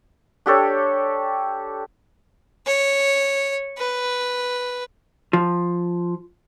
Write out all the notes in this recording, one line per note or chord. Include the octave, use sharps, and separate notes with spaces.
D4 G4 A4 C#5
C#5
B4
F3